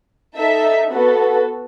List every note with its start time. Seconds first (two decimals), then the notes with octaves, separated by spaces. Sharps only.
0.36 D#4 A4 E5
0.91 B3 F#4 A4